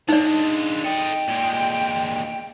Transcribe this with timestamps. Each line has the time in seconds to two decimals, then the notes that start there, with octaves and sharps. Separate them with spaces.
0.09 G#3 D4 D#4 D5
0.84 A4 D#5 G5
1.28 A#2 G#3